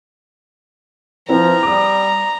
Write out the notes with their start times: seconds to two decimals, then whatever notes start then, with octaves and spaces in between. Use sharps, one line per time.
1.29 F3 C4 E4 B4 A#5
1.63 G3 D6 D#6